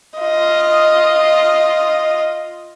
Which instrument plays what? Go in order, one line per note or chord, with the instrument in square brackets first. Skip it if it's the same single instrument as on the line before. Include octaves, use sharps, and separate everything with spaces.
[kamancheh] F4 D#5